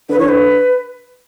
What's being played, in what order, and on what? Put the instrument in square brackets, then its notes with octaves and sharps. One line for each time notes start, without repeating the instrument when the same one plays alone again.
[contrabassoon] D3 [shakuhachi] B4
[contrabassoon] E3 [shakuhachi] C#5
[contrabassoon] D3 [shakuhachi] B4